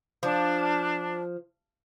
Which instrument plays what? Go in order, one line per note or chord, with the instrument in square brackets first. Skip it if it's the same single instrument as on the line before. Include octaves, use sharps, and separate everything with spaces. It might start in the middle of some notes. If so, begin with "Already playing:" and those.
[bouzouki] F3 [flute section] D4